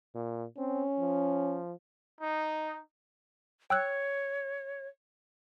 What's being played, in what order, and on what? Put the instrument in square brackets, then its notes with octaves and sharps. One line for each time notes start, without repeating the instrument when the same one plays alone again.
[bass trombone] A#2
[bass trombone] C4 [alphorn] C#4
[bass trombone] F3
[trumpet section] D#4
[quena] C#5 [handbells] G5 E6 F#6